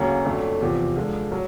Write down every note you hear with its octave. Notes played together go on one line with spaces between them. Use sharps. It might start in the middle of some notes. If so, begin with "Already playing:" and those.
Already playing: D2 C#3 F#3 A#3
F2 D3 F#3 A3
E2 C3 F3
D3 F3 G#3
F#3